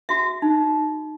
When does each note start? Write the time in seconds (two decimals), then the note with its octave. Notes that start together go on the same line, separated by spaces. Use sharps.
0.09 F#4 E5
0.42 D#4